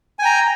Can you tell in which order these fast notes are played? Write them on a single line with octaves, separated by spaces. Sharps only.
G#5 G5 A#5